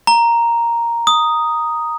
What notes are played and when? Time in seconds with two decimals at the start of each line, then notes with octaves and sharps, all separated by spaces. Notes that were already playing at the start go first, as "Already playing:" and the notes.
0.07 A#5
1.07 D#6